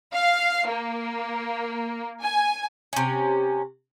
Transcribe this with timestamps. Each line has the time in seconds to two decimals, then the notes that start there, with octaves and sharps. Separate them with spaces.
0.13 F5
0.68 A#3
2.22 G#5
2.93 C3 C#4